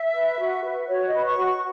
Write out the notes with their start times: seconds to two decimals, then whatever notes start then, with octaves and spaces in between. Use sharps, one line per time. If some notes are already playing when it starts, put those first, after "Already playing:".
Already playing: E5
0.14 B4
0.39 F#4
0.64 B4
0.88 F#4 C#5
1.07 D#5
1.14 B4 B5
1.25 C#6
1.38 F#4
1.44 C#6